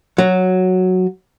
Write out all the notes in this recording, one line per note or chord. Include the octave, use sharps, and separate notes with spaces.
F#3